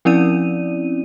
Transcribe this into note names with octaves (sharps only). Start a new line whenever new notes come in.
F3 C4 C#4 E4 D5 D#7